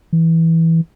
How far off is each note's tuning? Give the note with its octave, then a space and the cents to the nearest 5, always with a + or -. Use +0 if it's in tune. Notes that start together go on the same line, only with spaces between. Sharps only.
E3 -10